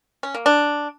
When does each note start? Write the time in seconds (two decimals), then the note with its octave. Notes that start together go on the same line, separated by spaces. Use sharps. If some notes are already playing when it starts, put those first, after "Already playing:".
0.23 C#4
0.34 A#3
0.46 D4